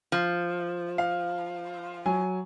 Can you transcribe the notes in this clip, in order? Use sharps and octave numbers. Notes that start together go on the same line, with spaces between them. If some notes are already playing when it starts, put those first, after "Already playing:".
F3
F5
F#3 G#5